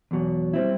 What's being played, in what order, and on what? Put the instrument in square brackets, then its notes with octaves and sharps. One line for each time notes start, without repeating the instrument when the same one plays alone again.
[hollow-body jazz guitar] E2 B2 F#3
G3 C4 E4